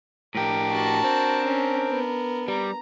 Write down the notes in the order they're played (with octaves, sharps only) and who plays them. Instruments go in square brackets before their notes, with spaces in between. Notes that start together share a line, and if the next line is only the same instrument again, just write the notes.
[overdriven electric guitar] A2 G4 [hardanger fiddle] D4 A#4
[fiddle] F#4 A5
[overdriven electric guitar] C4
[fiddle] C#4
B3
[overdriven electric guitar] G3 [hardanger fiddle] A#5